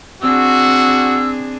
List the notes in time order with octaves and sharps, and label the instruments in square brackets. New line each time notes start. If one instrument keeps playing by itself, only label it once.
[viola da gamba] C4 D4 G#4 [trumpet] F#4 [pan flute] E6